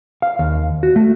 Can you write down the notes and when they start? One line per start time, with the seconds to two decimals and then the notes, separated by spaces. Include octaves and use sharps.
0.22 F5
0.39 D#2
0.83 F#4
0.96 A3